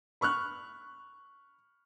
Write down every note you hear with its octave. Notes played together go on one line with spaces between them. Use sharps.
B5 C#6 F6 F#6